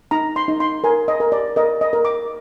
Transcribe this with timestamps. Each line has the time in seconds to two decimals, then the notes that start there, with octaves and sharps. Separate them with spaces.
0.11 D#4 A#5
0.36 C6
0.48 D#4
0.60 C6
0.84 A#4 G#5
1.08 D#5
1.20 A#4
1.32 D5
1.56 A#4 D#5
1.81 D#5
1.93 A#4
2.05 D6